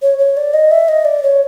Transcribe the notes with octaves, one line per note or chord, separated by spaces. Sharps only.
C#5
C#5
D5
D#5
E5
D#5
D5
C#5